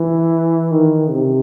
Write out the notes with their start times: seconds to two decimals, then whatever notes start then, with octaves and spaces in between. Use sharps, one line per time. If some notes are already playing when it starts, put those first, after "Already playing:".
Already playing: E3
0.71 D#3
1.10 C3